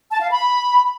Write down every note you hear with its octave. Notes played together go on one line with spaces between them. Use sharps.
A5
F5
B5